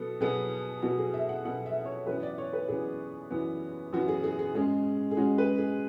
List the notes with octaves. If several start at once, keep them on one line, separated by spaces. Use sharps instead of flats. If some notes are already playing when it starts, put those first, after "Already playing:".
Already playing: B2 F#3 B3 A4
B2 F#3 B3 G#4
B2 F#3 B3 F#4
G#4
E5
F#5
B2 F#3 B3 F#5
E5
C#5
F#2 E3 B3 B4
D5
C#5
B4
F#2 E3 B3 G#4
F#2 E3 B3
F#2 E3 B3 F#4
G#4
G#4
G#4
G#2 G#3 C#4 G#4
G#4
G#2 G#3 C#4 F#4
B4
G#4